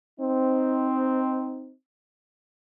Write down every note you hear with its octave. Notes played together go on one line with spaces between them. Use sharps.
C4 D#4